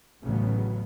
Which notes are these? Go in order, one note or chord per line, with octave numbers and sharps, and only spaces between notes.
A1 D2 A2 C#3 F#3 B3